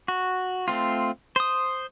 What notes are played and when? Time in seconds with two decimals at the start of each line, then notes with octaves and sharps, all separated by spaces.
0.08 F#4
0.68 A3 C4 F4
1.36 C5 D#6